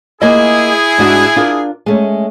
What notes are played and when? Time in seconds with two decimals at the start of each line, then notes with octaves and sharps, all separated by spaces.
0.22 A#3 E4 F4 G#4 D#5
0.98 G#2 D4 F#4
1.36 D4 F4 A#4
1.86 G#3 A3 C#4